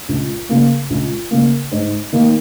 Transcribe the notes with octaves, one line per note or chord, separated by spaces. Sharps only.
C#2
C#3 A#3
C#2
C#3 A#3
G#2
D#3 A#3